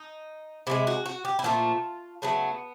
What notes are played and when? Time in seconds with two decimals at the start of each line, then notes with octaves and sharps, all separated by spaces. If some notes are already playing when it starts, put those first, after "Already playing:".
Already playing: D#4
0.67 C3 E3 G#3 E4
0.87 F#4
1.06 F#4
1.25 G4
1.39 E4
1.44 A#2 F3 A3 F4
2.22 C#3 F#3 A3 B3